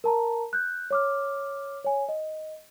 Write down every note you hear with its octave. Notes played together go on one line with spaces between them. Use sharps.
A#4 A5 A#5
F#6 G6
C#5 D6 F6
C#5 G#5
D#5